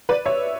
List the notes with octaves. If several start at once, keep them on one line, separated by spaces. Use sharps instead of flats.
B4 D5
C#5 E5